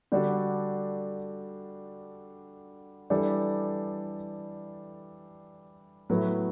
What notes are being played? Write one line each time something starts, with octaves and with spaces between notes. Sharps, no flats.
D3 G3 D4 F#4 A4
E3 G3 D4 A4
A2 F#3 B3 E4